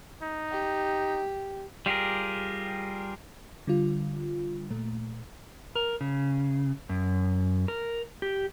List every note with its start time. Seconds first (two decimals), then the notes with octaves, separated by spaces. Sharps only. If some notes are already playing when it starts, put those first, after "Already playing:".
0.22 D#4
0.51 G4
1.86 G3 F4 G4 G#4 A#4
3.67 D3 G3 F4
4.70 A#2 A3
5.75 A#4
6.01 C#3
6.89 F#2
7.68 A#4
8.22 G4